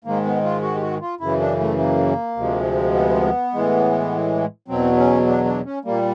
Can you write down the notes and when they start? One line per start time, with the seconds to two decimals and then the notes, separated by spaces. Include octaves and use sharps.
0.04 G#2 D#3 G#3 A#3
0.25 B3
0.44 F4
0.62 F#4
0.75 G4
0.82 F#4
1.01 F4
1.20 F#2 C#3 E3 E4
1.40 D4
1.60 A3
1.78 A#3
2.36 D2 C3 F3 G#3
2.95 B3
3.53 A2 E3 G#3
4.68 E2 B2 F#3 C4
4.98 C#4
5.27 D4
5.45 D4
5.65 C#4
5.85 A#2 G3 A#3